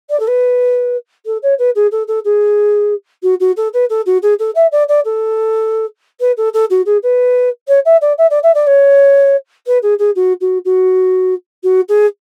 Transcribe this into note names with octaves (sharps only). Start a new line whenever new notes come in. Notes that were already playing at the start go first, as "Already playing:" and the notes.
D5
A4
B4
A4
C#5
B4
G#4
A4
A4
G#4
F#4
F#4
A4
B4
A4
F#4
G#4
A4
E5
D5
D5
A4
B4
A4
A4
F#4
G#4
B4
C#5
E5
D5
E5
D5
E5
D5
C#5
B4
G#4
G#4
F#4
F#4
F#4
F#4
G#4